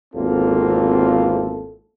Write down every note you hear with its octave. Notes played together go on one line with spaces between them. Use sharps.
G#1 E2 A#3 C4 F4 A4